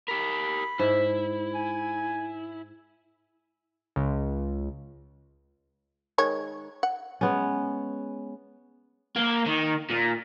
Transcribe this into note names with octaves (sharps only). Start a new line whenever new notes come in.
G4 A#4 B5
G#2 E4
G#5
C#2
D#3 G#3 C#5
F#5
G#3 B3 C#4
A#3
D#3
A#2